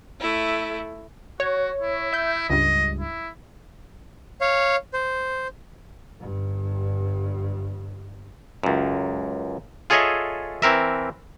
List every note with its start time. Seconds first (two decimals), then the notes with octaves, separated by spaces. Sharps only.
0.21 A3 E4
1.40 F#4 C#5
1.81 E4
2.13 E5 G6
2.50 C#2 G2 D#5
3.00 E4
4.41 C#5 F5
4.93 C5
6.20 G1 G2
8.63 C#2 F#2
9.90 F4 G#4 A4 C#5 D#5 E5
10.62 E3 C4 A#4 E5